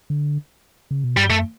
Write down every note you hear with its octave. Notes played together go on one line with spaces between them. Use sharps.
D3
C#3
B2
G2 G3
F#2 A3